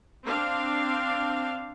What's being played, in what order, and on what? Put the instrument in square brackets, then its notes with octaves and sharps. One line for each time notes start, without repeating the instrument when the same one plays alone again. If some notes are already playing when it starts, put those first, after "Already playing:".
[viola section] C4 D4 F5